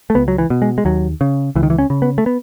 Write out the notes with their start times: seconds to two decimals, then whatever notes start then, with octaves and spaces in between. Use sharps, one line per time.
0.10 A3
0.15 C#2 B3
0.28 F#3
0.38 E3
0.50 B2
0.62 G#3
0.78 G#3
0.85 D#2 F#3
1.21 C#3
1.55 C#2 E3
1.63 D#3
1.70 E3
1.78 C#4
1.90 C#3
2.02 B3
2.18 A3
2.26 B3